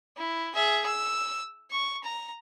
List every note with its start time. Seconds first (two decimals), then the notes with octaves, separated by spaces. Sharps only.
0.17 E4
0.55 G#4 E5
0.86 E6
1.71 C#6
2.04 A#5